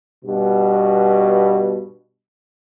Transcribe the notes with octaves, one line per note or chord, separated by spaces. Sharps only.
G2 B2